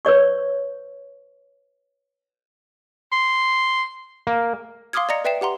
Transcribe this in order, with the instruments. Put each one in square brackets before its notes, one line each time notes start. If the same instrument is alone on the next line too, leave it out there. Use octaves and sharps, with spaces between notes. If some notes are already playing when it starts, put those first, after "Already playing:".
[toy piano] B4 C#5 D5 C#6
[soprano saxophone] C6
[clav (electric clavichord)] A#3
[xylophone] F5 C6 D6 D#6 F6 G#6
D5 D#5 A#5 A#6 C#7
B4 D5 E5 G5 C7 E7
G4 F#5 A#5 C6